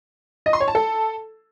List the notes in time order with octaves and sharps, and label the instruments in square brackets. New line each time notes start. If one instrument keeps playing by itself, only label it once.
[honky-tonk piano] D#5
C6
C#5
A5
A4